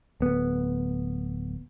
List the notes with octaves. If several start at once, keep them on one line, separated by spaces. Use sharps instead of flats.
D1 B3